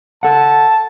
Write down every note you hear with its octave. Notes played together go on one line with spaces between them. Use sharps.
A4 F#5 A5